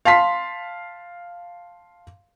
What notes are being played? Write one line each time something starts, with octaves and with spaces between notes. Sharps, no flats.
F5 A5 C6 B6